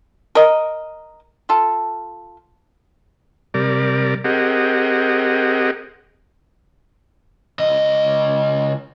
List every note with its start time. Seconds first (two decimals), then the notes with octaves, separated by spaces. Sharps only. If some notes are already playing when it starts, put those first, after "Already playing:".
0.35 A#4 D#5
1.49 F4 A4
3.54 C3 G3 A#4 D5
4.25 C4 G4 G#4 A#4 D#5 F#5
7.59 C#2 D#5